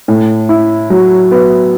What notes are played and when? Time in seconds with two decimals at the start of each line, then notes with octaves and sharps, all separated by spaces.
0.08 A2
0.49 E4
0.90 F#3
1.32 B3